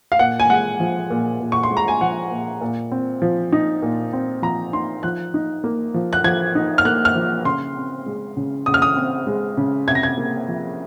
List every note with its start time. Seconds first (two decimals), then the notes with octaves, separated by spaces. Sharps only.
0.12 F5
0.19 A#2 F#5
0.40 G#5
0.50 G#3 F#5
0.80 F3
1.10 A#2
1.40 A#2
1.52 C#6
1.63 C6
1.71 G#3
1.77 A#5
1.88 G#5
2.01 F3 F#5
2.31 A#2
2.61 A#2
2.92 C4
3.22 F3
3.52 D#4
3.82 A#2
4.13 C4
4.42 F3 A#5
4.73 D#4 C6
5.03 F3 F#6
5.34 D#4
5.64 A#3
5.94 F3
6.13 F#6
6.24 F3 G#6
6.55 D#4
6.78 F6
6.85 A#3 F#6
7.05 F6
7.15 F3
7.45 C#3 C6
7.76 C4
8.06 G#3
8.37 C#3
8.66 C#3 D#6
8.74 F6
8.82 D#6
8.97 C4
9.27 G#3
9.57 C#3
9.88 C3 G#6
9.95 A#6
10.03 G#6
10.18 A#3
10.48 F3